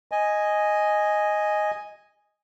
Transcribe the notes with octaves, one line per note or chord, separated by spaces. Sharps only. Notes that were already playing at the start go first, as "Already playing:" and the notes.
D#5 G#5